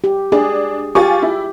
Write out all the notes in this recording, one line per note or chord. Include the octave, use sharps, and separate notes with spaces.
G4
D4 G#4
F4 G4 G#5 C#6
E4